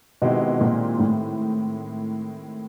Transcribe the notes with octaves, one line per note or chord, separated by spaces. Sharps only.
B2 D#3 G#3 C4 E4 G4
A#2
A2